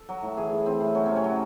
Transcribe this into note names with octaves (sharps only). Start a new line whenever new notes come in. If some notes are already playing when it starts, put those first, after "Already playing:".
Already playing: A4
F#3
A2
E3 G#4
A2
E3 C4
A2
F#3 C#4
C3 C4
C#4
F#3